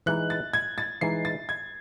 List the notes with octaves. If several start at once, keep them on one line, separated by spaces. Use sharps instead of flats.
E3 G#3 D#4 F#6
A6
G#6
A6
E3 G#3 D#4 C7
A6
G#6